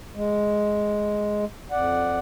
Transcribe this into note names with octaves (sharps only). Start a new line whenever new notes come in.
G#3
F2 D5 F#5